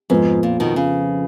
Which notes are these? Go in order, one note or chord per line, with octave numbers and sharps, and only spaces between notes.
F2 G#2 F3 B3 F4 B4
A#2
B2 D#3
C#3